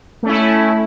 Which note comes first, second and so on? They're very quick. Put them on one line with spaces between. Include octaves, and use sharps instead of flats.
A3 C#4 E4